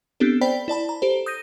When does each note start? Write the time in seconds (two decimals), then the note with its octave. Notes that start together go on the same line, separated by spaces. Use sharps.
0.20 B3 C4 D4 G4 A4
0.41 C5 D5 G5 B5 B6
0.68 E4 D5 A5 B5
0.89 A#5
1.02 G4 A4 C5
1.26 D#6 G6 A#6 D#7